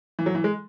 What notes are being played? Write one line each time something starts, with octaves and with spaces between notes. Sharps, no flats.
E3
F#3
E3
G#3